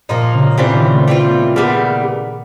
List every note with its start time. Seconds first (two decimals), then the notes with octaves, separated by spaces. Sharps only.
0.09 A#2 F3 A#3 D#4
0.34 C#3
0.58 C#3 E3 G3 C4 F4
0.74 D#3
0.91 A3
1.08 E3 G3 C4 F4
1.23 B3
1.39 A#3
1.56 C#3 E3 G3 A#3 B3